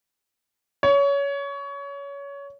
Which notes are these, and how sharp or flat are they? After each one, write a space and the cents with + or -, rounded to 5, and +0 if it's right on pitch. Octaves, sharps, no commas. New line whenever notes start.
C#5 +20